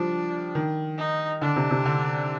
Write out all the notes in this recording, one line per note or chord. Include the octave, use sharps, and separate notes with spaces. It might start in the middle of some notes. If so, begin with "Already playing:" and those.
Already playing: F3 G3 D4
D#3
D#4
D3 D4
C3
C3
D3